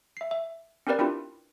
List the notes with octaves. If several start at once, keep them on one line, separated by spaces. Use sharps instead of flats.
E5 C7
E5
C4 C#4 G4 A#4 B4 D5
C4 D4 E4 F4 G4 B4